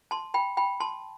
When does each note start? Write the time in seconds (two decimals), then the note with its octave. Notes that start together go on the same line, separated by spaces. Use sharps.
0.11 A5 C6
0.34 G5 B5
0.57 G5 B5
0.80 A5 C6